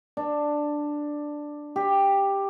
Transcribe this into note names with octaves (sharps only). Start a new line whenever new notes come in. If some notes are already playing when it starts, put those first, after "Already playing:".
D4
G4